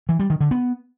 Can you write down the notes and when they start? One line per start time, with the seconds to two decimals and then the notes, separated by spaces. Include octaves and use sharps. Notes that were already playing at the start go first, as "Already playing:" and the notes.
0.09 E3
0.19 G3
0.30 D#3
0.40 D3
0.51 B3